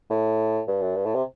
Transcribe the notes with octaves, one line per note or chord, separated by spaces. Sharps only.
A2
G2
F#2
G2
A2
C3